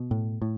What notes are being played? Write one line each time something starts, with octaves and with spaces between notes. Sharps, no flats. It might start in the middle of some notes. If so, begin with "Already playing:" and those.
Already playing: B2
A2
A2